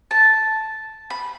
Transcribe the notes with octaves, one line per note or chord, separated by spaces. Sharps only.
A5
B5